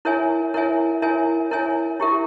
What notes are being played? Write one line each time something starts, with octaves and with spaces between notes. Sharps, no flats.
E4 A#4 C#5 E5 G#5
E4 A#4 C#5 E5 G#5
E4 A#4 C#5 E5 G#5
E4 A#4 C#5 E5 G#5
E4 G4 A#4 E5